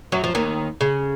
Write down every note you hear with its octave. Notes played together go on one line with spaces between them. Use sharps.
F#2 F#3
F3
D#2 D#3
C#3